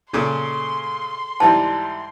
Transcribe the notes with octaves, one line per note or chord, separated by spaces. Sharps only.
A#2 C#3 G#4 A4 C6
G#2 E3 G3 A5